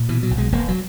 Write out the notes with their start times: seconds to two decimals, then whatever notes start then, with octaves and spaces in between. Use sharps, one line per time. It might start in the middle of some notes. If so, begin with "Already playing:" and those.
Already playing: A#2
0.09 B2 E3
0.23 F#3
0.31 B1
0.38 G#3
0.52 E1 A#3
0.68 F#3